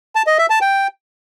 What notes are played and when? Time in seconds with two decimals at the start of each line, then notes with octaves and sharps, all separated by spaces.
0.15 A5
0.27 D#5
0.38 E5
0.50 A5
0.61 G5